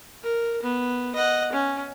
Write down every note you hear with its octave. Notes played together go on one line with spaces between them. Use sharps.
A#4
B3
D#5 F#5
C#4